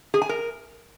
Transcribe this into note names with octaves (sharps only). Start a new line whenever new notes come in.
G#4
G#5
A#4